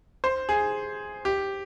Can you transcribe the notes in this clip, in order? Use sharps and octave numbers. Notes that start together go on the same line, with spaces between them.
C5
G#4
G4